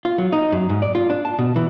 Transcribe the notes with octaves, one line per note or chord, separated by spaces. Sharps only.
F4
F#3
D#4
F#2
G#2
D5
F4
D4
A5
B2
E3